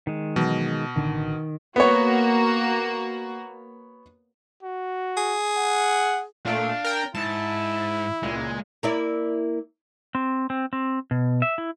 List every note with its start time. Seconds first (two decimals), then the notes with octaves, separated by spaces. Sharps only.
0.07 D#3 G#3
0.36 B2 E3 F#3
0.96 A1 D3 D#3 D4
1.76 A#3 B3 F#4 C#5
4.63 F#4
5.17 G#4
5.57 F#5
6.45 A#2 A3 D4 F5
6.84 A#4 G5
7.15 G#2 E4 A5
8.23 C#2 A#2 G#3
8.83 A#3 E4 D5
10.15 C4
10.50 C4
10.73 C4
11.11 B2
11.42 E5
11.58 E4